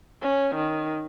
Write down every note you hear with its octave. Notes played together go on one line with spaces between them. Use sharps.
C#4
D#3